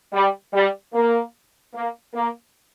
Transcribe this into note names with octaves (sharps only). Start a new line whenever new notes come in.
G3
G3
A#3
A#3
A#3